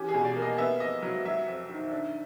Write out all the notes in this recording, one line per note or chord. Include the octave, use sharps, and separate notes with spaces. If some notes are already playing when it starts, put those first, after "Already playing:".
Already playing: E3 C#4 G4
G#4
B2
D5
A#3
D#5
B3 E5
F2 D#5
F#3
F#3 E5
F2
D#3
D4